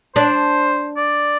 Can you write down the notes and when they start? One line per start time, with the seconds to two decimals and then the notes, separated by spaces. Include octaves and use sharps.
0.16 D4 C5
0.97 D5